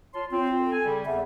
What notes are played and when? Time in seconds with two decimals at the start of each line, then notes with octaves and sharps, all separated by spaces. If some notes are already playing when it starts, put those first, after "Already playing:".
0.14 F4 C#5 A5 C6
0.31 C4 F4
0.59 A4
0.72 G#5
0.86 C#3 G3
1.06 E2 E5